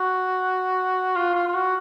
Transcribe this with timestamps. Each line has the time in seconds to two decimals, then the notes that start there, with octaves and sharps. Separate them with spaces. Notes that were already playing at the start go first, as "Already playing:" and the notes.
Already playing: F#4
1.16 F4
1.35 F4
1.47 F4
1.54 F#4